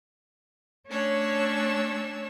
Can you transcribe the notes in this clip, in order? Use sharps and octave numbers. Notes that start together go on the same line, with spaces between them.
A3 C#4 D4 C#5 E6